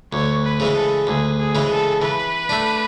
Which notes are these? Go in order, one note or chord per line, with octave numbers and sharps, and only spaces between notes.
D2 C#5
B4
C#3 E3 G#3
A4
D2 G#4
G#4
C#3 E3 G#3
A4
E3 B4
A3 D4